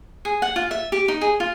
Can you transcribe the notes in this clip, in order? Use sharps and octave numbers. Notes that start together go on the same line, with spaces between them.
G#4
F#5
F4
E5
G4
D#4
G#4
F4